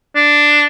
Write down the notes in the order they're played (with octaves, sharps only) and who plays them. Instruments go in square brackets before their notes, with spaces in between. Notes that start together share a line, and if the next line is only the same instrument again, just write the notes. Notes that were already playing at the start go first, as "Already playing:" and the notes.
[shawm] D4